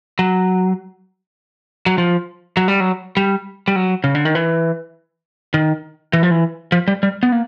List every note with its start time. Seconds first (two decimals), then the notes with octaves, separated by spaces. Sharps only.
0.19 F#3
1.86 F#3
1.98 F3
2.57 F#3
2.68 G3
2.80 F#3
3.17 G3
3.68 G3
3.76 F#3
4.04 C#3
4.15 D3
4.25 D#3
4.35 E3
5.54 D#3
6.13 E3
6.23 F3
6.31 E3
6.72 F3
6.88 G3
7.03 G3
7.23 B3
7.32 A#3